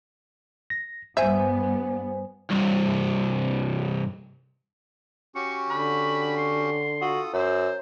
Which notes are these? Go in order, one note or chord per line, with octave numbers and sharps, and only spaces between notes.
A#6
G2 B3 C5 E5 G#5
C2 G2
C#4 F#4 G4 C#6
D3 B5
C6
F4 F#4 A4 D#6
F#2 C5 E6